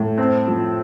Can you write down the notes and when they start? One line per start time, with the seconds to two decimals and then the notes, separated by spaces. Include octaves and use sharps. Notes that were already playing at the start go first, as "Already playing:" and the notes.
Already playing: A2
0.18 C4
0.48 F3